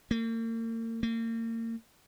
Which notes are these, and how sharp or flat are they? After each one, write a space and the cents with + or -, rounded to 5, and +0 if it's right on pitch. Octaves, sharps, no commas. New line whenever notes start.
A#3 -40
A#3 -35